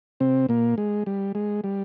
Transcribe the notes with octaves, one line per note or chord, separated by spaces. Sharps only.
C3 C4
A#2 A#3
G#3
G3
G#3
G3